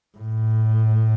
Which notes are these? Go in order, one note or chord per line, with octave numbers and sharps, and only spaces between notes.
A2